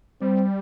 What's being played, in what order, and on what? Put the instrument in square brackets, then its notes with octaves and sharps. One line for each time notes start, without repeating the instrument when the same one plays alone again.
[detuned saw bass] G3 [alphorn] C4